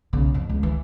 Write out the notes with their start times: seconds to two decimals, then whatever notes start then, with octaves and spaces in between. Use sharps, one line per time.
0.13 B1 C#3
0.34 F2 C3
0.49 C#2
0.63 E3